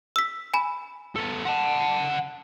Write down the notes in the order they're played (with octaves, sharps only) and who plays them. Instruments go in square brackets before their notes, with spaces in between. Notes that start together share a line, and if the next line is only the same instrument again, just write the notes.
[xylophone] E6 B6
G#5 B5
[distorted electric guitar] B3 A4
F#5 A5